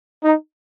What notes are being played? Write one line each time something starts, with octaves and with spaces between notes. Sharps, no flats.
D#4